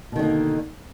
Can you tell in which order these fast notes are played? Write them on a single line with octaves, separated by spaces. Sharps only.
B2 D#3 D3 A#3